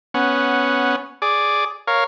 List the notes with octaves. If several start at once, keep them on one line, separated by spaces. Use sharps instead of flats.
B3 C#4 F#5
G#4 D5 D6
A#4 C#5 F5